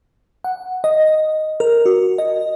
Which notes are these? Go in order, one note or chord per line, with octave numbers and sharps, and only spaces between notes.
F#5
D#5
A#4
F#4
D#5